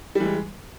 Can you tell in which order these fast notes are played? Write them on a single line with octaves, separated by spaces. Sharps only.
G3 E3 G#3